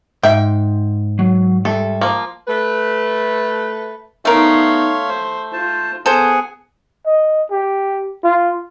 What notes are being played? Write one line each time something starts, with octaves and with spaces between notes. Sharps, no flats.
G#2 E5 G5
F#3
G3 A4 E5
F3 A#3
A3 B4
A3 B3 D#4 A#4 C#5 F5 C6
C5
F4 C5 A5
B3 G#4 A4 C5 F#5 G#5
D#5
G4
F4